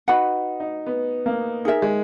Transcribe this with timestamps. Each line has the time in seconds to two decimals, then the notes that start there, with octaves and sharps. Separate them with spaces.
0.08 D#4 F#4 B4 F#5 B5
0.60 D#4
0.86 B3
1.26 A#3
1.65 D#4 G#4 A#4 E5
1.82 G#3